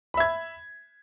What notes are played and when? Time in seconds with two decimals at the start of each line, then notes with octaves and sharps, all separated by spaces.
0.14 B5
0.17 E5
0.20 G#6